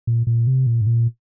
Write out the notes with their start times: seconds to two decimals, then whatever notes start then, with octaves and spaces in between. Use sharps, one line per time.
0.07 A#2
0.27 A#2
0.47 C3
0.67 A#2
0.81 G#2
0.87 A#2